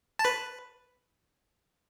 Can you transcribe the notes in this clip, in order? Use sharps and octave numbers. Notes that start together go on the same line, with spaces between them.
A5
B4 B5